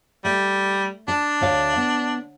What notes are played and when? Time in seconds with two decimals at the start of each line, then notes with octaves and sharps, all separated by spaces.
0.25 G3 A3
1.08 D4 A5
1.41 D2 C#5 F5
1.76 B3